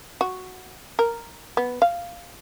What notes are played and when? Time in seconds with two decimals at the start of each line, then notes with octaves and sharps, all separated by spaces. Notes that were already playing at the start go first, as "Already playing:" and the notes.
0.21 F#4
0.99 A#4
1.57 B3
1.82 F5